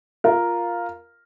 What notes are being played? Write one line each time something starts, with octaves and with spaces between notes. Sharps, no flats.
F4 A#4